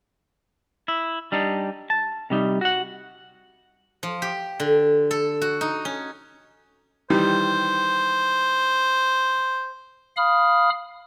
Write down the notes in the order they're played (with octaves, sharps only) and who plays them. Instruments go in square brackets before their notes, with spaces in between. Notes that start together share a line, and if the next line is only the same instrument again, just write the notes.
[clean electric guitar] E4
G3 D4 D#4
A5
C3 G3 D#4
F#4 F#5
[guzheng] F3
G4
D3
A4
F#4
D#4
C#4
[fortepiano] D#3 E3 G3 [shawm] C5
[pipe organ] F5 B5 D#6 F6